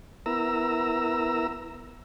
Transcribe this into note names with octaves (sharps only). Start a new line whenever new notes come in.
B3 E4 A#4 A#5 E6